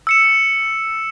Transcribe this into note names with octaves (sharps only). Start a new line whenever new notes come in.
E6 C#7 E7